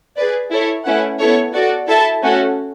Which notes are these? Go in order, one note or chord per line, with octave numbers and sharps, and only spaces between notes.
G#4 B4 D5
E4 A4 C#5
A3 C#4 E4 B4 F#5
B3 E4 A4 C#5
F#4 A4 D5
E4 A4 E5 A5
A3 C#4 F#4 A4